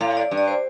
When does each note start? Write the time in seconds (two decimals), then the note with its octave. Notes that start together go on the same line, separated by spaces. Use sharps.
0.01 A2 F5
0.17 D5
0.31 G2
0.38 D5
0.48 C5